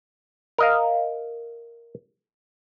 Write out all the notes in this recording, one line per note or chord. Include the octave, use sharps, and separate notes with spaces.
A#4 D#5 F5